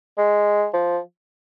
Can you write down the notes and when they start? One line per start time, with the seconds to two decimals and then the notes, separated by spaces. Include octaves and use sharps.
0.18 G#3
0.74 F3